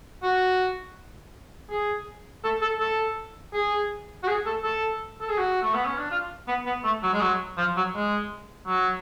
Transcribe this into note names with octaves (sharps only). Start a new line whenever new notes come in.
F#4
G#4
A4
A4
A4
G#4
F#4
G#4
A4
A4
A4
G#4
F#4
A3
B3
C#4
D4
F4
B3
B3
A3
F#3
G#3
F#3
F3
F#3
G#3
F#3